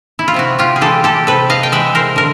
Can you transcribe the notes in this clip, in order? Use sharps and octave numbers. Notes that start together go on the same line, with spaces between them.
E4
F4
C3 E4 F#4
F4 G4
G#4
E3 G#3 G4 A4
G4 A4
C3 A4 B4
D#5 F5
G5
E3 G#3 E5 F#5
A#4 C5
D3 A#4